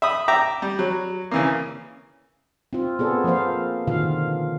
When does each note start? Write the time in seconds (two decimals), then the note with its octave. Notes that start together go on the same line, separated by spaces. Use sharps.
0.02 E5 B5 D#6
0.28 E5 G5 A#5 D6
0.62 G3
0.79 F#3
1.31 C#3 E3 A#3
2.73 C4 F4
2.99 B3 G#4 A4 D5
3.24 F3 A#3 A#4 C5 F5
3.87 B2 D3 D#3 F4 F5